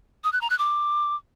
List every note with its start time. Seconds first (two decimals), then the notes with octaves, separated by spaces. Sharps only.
0.24 D#6
0.33 F#6
0.41 A#5
0.50 F#6
0.59 D6